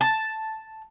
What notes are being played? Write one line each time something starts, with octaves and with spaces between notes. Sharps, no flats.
A5